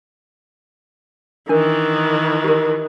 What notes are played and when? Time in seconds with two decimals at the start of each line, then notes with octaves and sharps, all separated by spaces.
1.49 D#3 E3 D4 A#4
2.44 G4 A#4